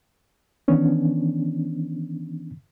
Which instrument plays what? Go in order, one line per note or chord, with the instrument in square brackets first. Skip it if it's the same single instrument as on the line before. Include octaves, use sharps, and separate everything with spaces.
[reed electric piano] D#3 E3 B3 C#4 D4